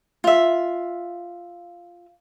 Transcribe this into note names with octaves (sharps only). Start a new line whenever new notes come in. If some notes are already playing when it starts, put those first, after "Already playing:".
F4 E5